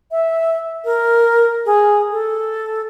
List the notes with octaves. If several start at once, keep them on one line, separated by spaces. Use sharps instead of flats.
E5
A#4
G#4
A4